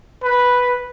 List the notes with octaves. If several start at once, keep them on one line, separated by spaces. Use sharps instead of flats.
B4